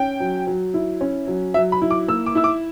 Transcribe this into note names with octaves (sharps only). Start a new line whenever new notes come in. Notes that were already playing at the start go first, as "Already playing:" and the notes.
Already playing: C#4 G5
F#3
F#3
E4
C#4
F#3
F#3 E5
B5
E4
D6
A#3 E6
D6
E4 E6
D6